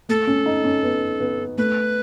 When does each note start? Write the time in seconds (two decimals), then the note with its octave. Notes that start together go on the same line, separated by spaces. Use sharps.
0.09 A3 A4
0.27 C#4
0.46 D#4
0.64 C#4
0.83 B3
1.20 B3
1.58 A3 B4